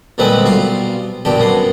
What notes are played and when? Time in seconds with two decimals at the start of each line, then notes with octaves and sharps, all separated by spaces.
0.18 A#1 D3 G3 G#3 C4 B4
0.45 B1 G3 F4 C6
1.25 A#1 G2 B2 D4 G4
1.39 F#2 B3 C6